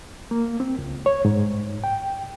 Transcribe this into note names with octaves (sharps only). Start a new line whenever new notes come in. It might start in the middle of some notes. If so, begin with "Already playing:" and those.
A#3
C4
C#2
C#5
G#2
G5